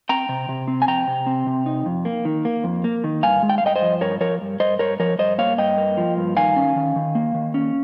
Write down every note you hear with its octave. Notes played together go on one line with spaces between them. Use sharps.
C4 G5 A#5
C3
C3
C4
G#5
F2 G5 A#5
C3
C4
C3
D#4
F2
A#3
D#3
A#3
F2
A#3
D#3
G2 F5 G#5
G#3
G5
F5
G2 D#5 G5
C5 D#5
F3
G2 A#4 C#5
F3 A#4 C#5
G2
G2 C5 D#5
G2 A#4 C#5
F3 A#4 C#5
G2 C5 D#5
A#3 C#5 F5
G2 D#5 G5
A#3
F3
G2
D#3 F5 G#5
C#4
D#3
D#3
A#3
D#3
C#4